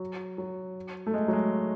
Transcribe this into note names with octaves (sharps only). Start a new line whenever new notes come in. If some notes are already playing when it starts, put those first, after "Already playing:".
Already playing: F#3
F#3
A3
G#3
F#3
G#3